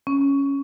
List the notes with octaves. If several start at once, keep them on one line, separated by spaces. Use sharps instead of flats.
C#4